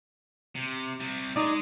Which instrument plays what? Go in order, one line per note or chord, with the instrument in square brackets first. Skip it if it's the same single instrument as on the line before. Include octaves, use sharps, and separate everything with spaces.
[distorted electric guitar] C3
C3 G3
[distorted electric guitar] G#3 D#5 [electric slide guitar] D#4 D5